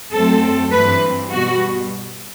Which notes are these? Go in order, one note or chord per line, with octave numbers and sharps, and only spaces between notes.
F#2 F#3 A3 C4 A4
G2 E3 G3 C4 B4
B2 G3 B3 F#4